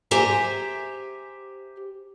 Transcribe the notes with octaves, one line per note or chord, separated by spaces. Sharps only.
G4 C5 E5 G#5 A#5